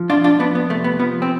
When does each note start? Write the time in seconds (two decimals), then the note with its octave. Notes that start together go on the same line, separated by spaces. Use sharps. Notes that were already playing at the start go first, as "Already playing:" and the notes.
Already playing: F3
0.10 F2 D4 F4
0.24 D4 F4
0.39 F2 B3 D4
0.55 B3
0.69 C3 A3
0.84 B3
0.99 F3 B3
1.22 C4